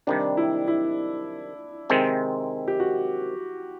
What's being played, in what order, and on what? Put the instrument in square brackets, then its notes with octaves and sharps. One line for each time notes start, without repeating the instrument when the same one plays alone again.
[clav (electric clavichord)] C3 D#3 G3 [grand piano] D4
[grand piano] E4
E4
[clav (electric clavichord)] C3 D#3 G#3 C4
[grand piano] G4
F#4